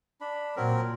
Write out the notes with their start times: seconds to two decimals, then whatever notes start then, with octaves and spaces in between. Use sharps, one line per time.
0.21 D4 B5
0.56 A#2 F#3 C4 A#4